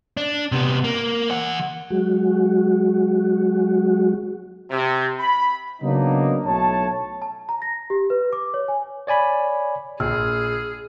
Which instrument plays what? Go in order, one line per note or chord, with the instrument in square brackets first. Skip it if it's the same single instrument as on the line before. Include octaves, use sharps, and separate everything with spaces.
[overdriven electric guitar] D4
C3 B3
A#3
E3 F#5
[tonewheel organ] F#3 G#3 F#4
[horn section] C3
B5
[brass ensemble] C#3 F#3 A#3 B3 D4 D#4
B1 A2 C#5 A5
[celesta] A5
A#5
A#6
G4
B4
D6
C#5
G#5
[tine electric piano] C#5 D5 G#5 B5
[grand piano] A#1 [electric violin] G#4 [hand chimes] E6 F6